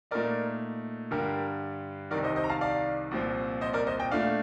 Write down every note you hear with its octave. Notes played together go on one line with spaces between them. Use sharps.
A#2 A3 D#4 A#4 D5
G2 D3 G3 G4 A#4
C2 C3 D#3 A#4 D5
C5 D#5
C5 D#5
A#5
F5 A5
D5 F5
C2 A#2 F3 C4
C5 D#5
A#4 D5
C5 D#5
D#5 G5
A#2 A3 D4 D5 F5